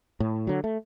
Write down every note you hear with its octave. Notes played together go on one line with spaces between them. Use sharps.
A2
D3 F#3
A3